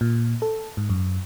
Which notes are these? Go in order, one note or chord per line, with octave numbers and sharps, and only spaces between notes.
A#2
A4
G#2
F#2